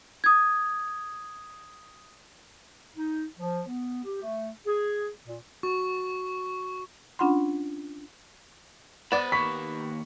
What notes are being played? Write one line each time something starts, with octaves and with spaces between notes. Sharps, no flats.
D#6 G#6
D#4
F3
B3
G4
A3
G#4
A#2
F#4 C#6
C#4 D4 F4 F#5 B5 C6
B3 C5 D5 B5 E7
D#2 A#3 B5 C#6 B6